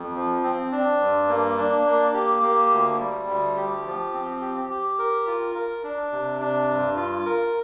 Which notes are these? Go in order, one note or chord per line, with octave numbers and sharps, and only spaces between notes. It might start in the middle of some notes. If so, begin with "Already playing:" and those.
Already playing: F2
F3
C4
D4
G2
A#3
D4
A#3
G4
A#3
D2
G3
D2
G4
F3
C4
G4
G4
A#4
F4
A#4
D4
C3
D4
G2
F4
A#4